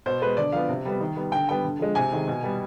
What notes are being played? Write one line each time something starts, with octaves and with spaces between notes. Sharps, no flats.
B2 C5
G#3 B3 B4
D3 D5
F3 B3 F5
C3
G3 B3
D#3
G3 B3
D3 G5
G3 B3 G5
D3
F3 G#3
C3 G#5
D#3 G#3
B2
G3 B3